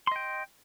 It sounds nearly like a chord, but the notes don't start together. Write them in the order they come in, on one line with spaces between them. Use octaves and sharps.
C6 D#5 G5